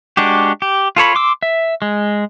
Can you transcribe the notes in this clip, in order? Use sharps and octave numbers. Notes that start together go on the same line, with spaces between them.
G#3 D4 F#4 G4
G4
F4 A4 C#5 B5
C6 D6 E6
E5
G#3